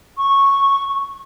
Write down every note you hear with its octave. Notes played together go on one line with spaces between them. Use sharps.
C#6